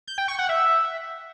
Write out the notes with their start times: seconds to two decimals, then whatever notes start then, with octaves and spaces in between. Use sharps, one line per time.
0.07 G6
0.18 G5
0.28 C#6
0.39 F#5
0.49 E5